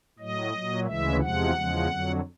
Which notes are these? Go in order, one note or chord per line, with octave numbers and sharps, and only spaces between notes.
A2 F#3 D#5
A#2 F#3
D2 C#3 E3 G#3 E5
E2 C3 F3 G#3 F#5
E2 C#3 F3 G#3
F2 D3 F#3